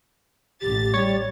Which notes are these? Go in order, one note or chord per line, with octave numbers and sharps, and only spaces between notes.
A1 G4 A6
G3 C#5